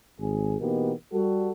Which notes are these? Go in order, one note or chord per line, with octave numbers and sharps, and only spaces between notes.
G#1 G#4
B2 E3 A#3 B3 D#4 G4
G3 F#4 A4